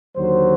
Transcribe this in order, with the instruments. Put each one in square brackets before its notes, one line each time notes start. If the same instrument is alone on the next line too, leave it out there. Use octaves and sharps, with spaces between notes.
[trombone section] D#2 D3 F#3 C5